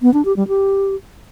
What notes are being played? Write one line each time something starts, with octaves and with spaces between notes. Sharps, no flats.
B3
D4
G4
G3
G4